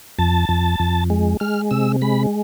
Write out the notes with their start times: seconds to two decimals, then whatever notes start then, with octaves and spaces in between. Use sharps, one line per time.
0.19 F2 A5
0.49 F2
0.80 F2
1.10 G#3
1.40 G#3 F6
1.71 C3 E6
2.02 G#3 B5